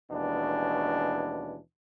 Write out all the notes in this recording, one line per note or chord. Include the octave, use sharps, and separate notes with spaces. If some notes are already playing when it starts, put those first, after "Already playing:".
D#2 B2 E3 G#3 C#4 D4